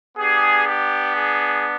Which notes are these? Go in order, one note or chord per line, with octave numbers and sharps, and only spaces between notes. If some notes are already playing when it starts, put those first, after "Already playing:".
B3 D4 G4 G#4
G4
G#4